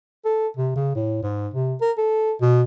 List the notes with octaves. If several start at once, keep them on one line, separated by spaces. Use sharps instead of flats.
A4
C3
C#3
A2
G#2
C3
A#4
A4
B2